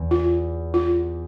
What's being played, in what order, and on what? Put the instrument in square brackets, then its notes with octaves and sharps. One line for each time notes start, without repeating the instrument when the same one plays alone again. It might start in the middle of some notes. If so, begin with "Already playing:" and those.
Already playing: [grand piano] E2
[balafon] F4
F4